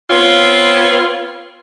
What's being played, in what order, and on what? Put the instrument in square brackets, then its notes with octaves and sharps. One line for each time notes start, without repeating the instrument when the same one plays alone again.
[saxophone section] B3 C4 F4 C#5